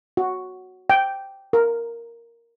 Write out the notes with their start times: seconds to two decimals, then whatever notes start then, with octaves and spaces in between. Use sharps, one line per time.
0.17 F#4
0.90 G5
1.53 A#4